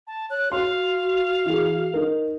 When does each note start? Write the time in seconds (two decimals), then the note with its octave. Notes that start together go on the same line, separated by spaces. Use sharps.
0.07 A5
0.30 C#5 F#6
0.52 F#4 F5 C6
1.45 E3 G#4
1.94 D#4 A#4